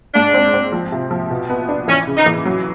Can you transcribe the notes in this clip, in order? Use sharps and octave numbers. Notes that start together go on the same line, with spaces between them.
G#2 D4
C4
C4
F3
C3
F3
B2
B3
D4
E3 C#4
C#3
D#4
E3
F#3